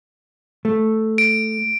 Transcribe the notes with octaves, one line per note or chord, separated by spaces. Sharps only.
A3
D7